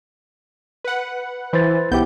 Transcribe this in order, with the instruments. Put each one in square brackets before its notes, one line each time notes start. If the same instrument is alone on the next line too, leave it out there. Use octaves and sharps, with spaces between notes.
[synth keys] B4 F#5
[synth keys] E3 [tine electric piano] B4 C5 A6
[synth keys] B1 G6 [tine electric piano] B3 E4 G4